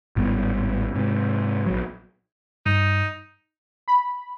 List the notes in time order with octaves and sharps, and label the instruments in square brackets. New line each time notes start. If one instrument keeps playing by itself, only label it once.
[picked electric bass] G#1 A2 G3 B3
G#2 C3
A#1 F#3
[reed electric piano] G2 [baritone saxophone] D#4
[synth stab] B5